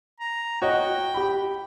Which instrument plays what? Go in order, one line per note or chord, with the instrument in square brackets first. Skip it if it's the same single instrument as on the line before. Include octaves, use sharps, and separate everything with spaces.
[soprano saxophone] A#5
[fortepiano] F#4 C#5 D#5 [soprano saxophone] G5
[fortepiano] G4 B5